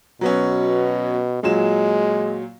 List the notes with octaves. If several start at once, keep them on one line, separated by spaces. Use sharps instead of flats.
B2 F#3 B3 C#4
A#2 F#3 G#3 E7